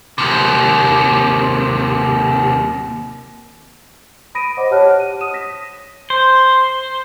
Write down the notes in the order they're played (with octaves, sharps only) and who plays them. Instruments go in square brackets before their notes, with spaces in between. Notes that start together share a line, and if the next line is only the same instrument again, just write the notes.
[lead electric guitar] D#2 C3
[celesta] B5 D#6 A#6 D7 D#7
C5 D#5 F#5 D6
G4 C#5 F#5 A5 F6 F#6
D#7
D#6 D#7 E7
A#6 B6
[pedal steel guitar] C5